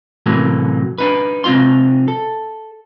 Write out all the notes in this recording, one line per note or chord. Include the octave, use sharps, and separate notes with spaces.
A2 C3 E3 F#3 A3 A#3
D4 D#4 B4
C3 C4 D#4 F4 C6
A4